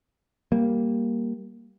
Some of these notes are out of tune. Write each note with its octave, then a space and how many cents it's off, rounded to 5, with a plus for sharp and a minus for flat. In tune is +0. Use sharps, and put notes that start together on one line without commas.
G3 +0 A#3 +0